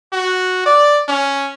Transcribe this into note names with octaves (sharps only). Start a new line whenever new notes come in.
F#4
D5
C#4